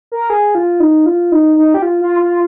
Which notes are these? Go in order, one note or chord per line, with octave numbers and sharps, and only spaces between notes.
A#4
G#4
F4
D#4
F4
D#4
D#4
G4
F4
F4
F4